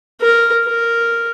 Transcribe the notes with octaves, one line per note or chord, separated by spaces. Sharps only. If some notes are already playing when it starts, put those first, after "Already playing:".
A#4
A#4